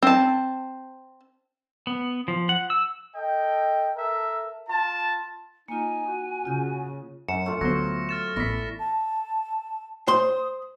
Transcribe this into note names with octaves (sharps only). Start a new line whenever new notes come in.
C4 A5
B3
F3
F#5
E6
A4 D#5 G5
A4 A#4 E5
F4 A5
A#3 D#4 F4 G#5
F#4
C#3 F4 G6
F#2 C#7 E7
A3 F4
D2 F#3 B3 C5 A#6
F6 A6 E7
A1 B3 E4 D5 F5 A#6 B6
A5
C5 C6 D#6